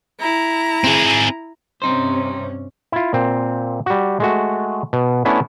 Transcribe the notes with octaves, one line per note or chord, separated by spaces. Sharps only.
E4 A#5
C4 G#4
G2 C3 C4 C#4 D#4 C5
E4 F4
A#2 C4
G3 F#4
G#3 A3 F#4
B2
A3 B3 C#4 D4 E4